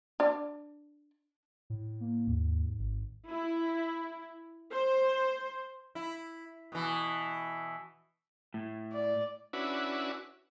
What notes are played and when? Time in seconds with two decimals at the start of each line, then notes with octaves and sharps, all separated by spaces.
0.20 D4 D5
1.70 A2
2.00 A#3
2.28 D#2 G#2
2.79 G#1
3.29 E4
4.72 C5
5.95 E4
6.72 B2 E3
8.54 A2
8.92 D5
9.53 C#4 D4 E4 F#4 B4